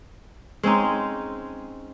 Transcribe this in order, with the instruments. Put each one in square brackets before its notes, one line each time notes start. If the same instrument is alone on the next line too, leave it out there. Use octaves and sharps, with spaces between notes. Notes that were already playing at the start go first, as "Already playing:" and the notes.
[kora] G#3 C4 C#4 D#4